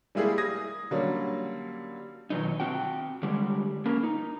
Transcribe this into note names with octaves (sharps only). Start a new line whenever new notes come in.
G3 G#3 A#3 E4 G4 G#4
D#6 G#6 A#6
D3 F#3 G3 A#3 C#4
B2 D#3 F#3 D#4
C4 F#4 G5
D3 G3 G#3
A#3 C#4 A#4
D#4